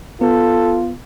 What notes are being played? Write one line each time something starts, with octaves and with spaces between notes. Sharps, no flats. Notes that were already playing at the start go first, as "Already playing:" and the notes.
B3 F4 A4